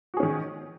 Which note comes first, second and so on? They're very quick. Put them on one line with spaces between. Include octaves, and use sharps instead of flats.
F#4 G#4 C#4 D#3